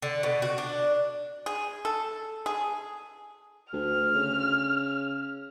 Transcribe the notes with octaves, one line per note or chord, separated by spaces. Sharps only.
D3
B2
F#4
D4
G#4
A4
G#4
D2 F6
C#3